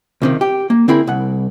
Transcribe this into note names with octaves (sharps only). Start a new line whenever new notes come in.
C#2 C3 D#3
G4
A#3
D3 C4 E4 G#4 A#4 B5
C2 F#5